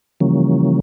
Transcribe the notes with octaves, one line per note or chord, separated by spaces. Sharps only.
C#3 E3 F3 G3 A#3 C#4